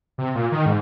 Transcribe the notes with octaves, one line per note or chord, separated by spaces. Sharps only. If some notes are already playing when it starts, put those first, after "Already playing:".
C3
A#2
D#3
G#2